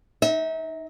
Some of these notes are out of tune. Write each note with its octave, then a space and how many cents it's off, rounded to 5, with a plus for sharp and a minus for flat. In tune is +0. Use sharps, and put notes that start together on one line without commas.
D#4 +0 E5 -35